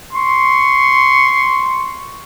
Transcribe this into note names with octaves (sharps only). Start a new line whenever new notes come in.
C6 C#6